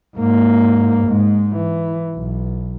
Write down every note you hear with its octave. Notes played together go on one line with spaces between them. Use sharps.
G#2 A#3
G#2 G#3
E3
B1